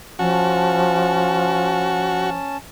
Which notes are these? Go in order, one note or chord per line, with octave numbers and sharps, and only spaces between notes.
F3 C#4 F#4 A5